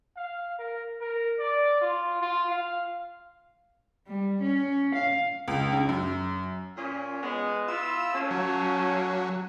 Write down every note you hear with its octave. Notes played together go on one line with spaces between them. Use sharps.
F5
A#4
A#4
D5
F4
F4
F5
G3
C#4
F5
C#2
C#3
F#2
A#2 C#4
G#3 B3
E4 F4 E6
A3 A#3 C#4
F#3